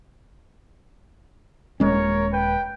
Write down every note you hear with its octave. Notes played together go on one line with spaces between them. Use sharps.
D#1 G#3 C#4 A#4 C#5
B4 G5